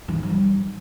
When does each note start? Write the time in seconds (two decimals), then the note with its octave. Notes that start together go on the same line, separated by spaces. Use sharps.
0.08 E3
0.16 G#2
0.23 F#3
0.30 G3